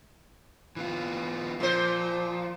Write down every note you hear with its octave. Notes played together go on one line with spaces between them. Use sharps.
E3 B3 F4
A#2 F3 C5